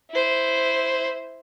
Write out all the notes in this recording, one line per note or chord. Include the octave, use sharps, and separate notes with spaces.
E4 C5